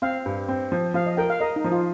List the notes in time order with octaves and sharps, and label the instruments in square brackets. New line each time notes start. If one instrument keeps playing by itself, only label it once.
[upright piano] C4 [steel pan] F5
[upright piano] G2
C4
F3
[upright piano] F3 [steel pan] F5
[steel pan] D#5
[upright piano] A#4 [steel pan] G5
[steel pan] F5
[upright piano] A#4 [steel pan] D#5
[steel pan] D#4
[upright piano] F3
[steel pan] F4